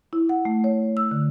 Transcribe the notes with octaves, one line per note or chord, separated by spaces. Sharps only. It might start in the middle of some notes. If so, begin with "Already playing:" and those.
E4
F#5
A3
C#5
E6
D3